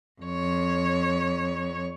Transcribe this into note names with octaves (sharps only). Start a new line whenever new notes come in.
F2 C#5